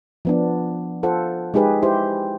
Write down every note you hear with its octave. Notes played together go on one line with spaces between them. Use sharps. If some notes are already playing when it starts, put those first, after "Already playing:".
F3 B3 D4
F4 A4 C5 F#5
G#3 D#4 G4 G#4 B4
E4 G4 C5